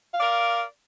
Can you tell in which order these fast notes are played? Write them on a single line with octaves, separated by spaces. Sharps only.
F5 D5 A#4